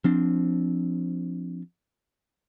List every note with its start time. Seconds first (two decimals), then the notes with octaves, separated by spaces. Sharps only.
0.04 F3 C4 D4